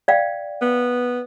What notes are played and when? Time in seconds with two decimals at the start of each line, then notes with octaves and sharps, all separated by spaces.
0.08 D5 F5 G5
0.62 B3